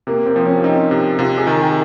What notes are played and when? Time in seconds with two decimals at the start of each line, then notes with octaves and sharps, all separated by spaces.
0.07 C3 A#3
0.26 C4
0.36 F3
0.45 C#4
0.64 C4 D#4
0.91 C3
1.19 C3 F4
1.38 G#4
1.47 D#3
1.57 A#4